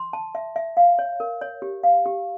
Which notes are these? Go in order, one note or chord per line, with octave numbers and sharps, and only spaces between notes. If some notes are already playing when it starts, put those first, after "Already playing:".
Already playing: C6
A5
E5
E5
F5
C#5
A#4
C#5
G4
F5
G4